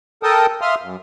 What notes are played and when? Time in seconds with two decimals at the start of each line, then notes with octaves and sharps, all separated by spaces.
0.23 A4 A#4 G5 A5 D#6
0.61 E5 F5 C6 D#6 F6
0.82 F#2